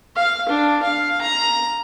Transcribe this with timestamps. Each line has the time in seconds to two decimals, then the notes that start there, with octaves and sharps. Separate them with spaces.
0.16 F5
0.49 D4
0.83 F5
1.21 A#5